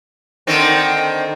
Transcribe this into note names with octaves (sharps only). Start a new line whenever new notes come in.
D3 D#3 C4